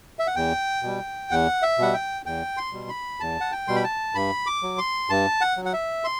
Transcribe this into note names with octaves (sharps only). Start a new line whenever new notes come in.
E5
F#5
E2 G5
B2 G3
E2 F#5
E5
B2 G3 F#5
G5
E2 G5
C6
B2 G3
B5
E2 A5
F#5
G5
B2 G3 C6
B5
A5
G2 B5
D6
F#3
C6
G2 A5
F#5
F#3
F#5
E5
C6